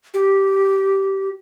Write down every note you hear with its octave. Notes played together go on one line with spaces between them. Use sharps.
G4